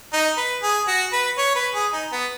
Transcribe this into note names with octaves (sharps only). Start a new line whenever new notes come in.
D#4
B4
G#4
F#4
B4
C#5
B4
G#4
D#4
B3